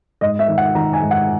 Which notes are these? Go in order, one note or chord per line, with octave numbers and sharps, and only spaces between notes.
G#2 D#5
E5
D#3
F#5
D#3 A#5
G#5
G#2
F#5